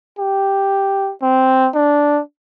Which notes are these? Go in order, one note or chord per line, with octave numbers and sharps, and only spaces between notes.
G4
C4
D4